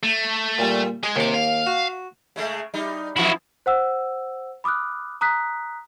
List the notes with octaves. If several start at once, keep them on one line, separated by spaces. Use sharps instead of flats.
A3
A#2 G3
G#3 G#4
D#2 C3 D6
F5
F#4
C#3 G#3 A3
G3 D#4
F2 E3 F3 E4 F#4
C5 F#5 E6
B5 D6 D#6 F6 F#6
A#5 D#6 F#6 B6